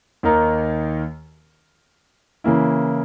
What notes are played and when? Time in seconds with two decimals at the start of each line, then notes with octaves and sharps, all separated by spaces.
0.23 D#2 D#3 A#3 D#4 A#4
2.44 C#3 E3 A#3 E4